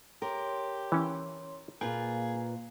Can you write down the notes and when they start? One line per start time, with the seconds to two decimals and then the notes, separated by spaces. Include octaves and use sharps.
0.22 G4 A#4 C#5 C6
0.92 E3 C#4
1.81 A#2 A#3 F4 G#4 B4 F5 G5